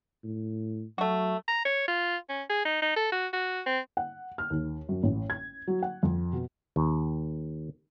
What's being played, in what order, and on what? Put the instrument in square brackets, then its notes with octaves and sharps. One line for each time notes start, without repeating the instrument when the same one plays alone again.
[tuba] A2
[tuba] F#3 [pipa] A3 F#4
[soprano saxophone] A#5
C#5
F4
C#4
G#4
D#4
D#4
A4
F#4
F#4
C4
[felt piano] F#5
F6
D#2
F#2
A1
G#6
F#3
F#5
F2
B2
[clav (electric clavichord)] D#2